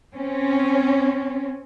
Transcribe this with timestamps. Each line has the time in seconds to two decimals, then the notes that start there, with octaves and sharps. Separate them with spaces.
0.15 C4 C#4